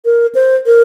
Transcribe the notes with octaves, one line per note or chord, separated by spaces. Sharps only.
A#4
C5
A#4